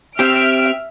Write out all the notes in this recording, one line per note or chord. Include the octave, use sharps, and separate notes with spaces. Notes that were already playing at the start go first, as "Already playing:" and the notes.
C4 G4 E5 F6 D7